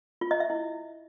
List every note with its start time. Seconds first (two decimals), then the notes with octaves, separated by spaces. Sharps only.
0.21 F4
0.31 D#5
0.40 E5
0.50 E4